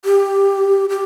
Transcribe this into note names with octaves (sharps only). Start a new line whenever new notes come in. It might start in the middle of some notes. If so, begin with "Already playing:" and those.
G4
G4